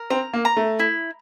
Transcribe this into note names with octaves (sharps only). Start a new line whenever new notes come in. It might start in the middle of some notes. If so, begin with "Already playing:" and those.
Already playing: A#4
C4 A#5
A#3
A#5
A3
E4